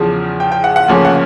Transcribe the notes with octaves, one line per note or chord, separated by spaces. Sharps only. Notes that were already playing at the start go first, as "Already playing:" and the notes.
Already playing: E2 C#3 F3
G5
G5
F#5
F#5
D2 C#3 F3 A#3 C#4
F#5